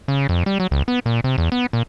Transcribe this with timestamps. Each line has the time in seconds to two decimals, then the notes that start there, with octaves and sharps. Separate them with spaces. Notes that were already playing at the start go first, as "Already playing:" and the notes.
0.08 C#3
0.29 F2
0.46 G3
0.60 F#3
0.71 C#2
0.88 B3
1.06 A#2
1.24 C3
1.38 E2
1.52 B3
1.73 A#2